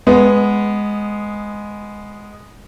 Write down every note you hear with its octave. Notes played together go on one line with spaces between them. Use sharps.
G#3 B3